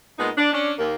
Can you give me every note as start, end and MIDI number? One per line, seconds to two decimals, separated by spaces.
0.19 0.30 46
0.19 0.30 56
0.19 0.30 59
0.19 0.30 63
0.37 0.52 62
0.53 0.73 61
0.53 0.73 62
0.78 0.96 39
0.78 0.96 58